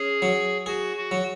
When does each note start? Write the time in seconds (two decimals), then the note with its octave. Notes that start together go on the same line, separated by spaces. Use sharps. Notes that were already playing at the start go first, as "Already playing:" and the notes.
Already playing: C#4 G#4
0.22 F#3
0.66 F#4 G#4
0.96 F#4
1.11 F#3